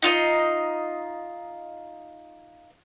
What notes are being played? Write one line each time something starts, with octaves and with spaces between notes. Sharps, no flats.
D#4 F4 D#5